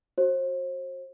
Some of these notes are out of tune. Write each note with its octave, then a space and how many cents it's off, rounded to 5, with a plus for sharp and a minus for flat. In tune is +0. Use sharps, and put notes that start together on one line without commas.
F#4 -10 C5 +35